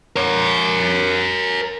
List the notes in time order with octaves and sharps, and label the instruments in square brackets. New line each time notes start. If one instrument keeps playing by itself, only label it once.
[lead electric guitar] A#4 C#5